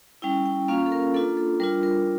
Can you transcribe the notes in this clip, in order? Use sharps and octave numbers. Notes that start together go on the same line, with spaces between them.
G3 C#4 E4 G5
G5
A#3 C#4 F4 F5
A4
A#4
A#3 D4 F4 A4
A4
G3 D4 F4 A#4
A#4